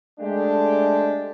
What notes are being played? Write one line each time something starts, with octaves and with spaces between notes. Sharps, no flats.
G#3 A3 D4 G4